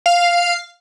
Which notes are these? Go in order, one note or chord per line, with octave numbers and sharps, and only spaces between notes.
F5